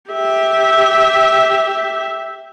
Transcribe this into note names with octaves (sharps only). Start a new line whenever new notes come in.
G4 E5